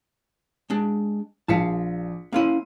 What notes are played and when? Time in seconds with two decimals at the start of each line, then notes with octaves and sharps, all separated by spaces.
0.70 G#3 D4
1.48 A#1 F5 A5 B6 C#7
2.33 A#3 C#4 E4 F5 C6 D#7